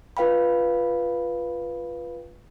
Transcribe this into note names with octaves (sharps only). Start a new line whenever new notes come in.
F4 B4 F5 G5 B5